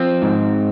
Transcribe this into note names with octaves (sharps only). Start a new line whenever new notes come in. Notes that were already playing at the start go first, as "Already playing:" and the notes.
Already playing: F3 C4
G#2